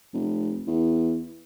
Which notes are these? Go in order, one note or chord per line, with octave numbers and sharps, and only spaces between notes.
F1
E2